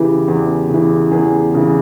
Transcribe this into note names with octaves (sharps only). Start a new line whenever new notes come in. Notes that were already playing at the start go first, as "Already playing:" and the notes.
Already playing: E2 C#3 E3 G4
E2
C#3 E3
E2 G#4
C#3 E3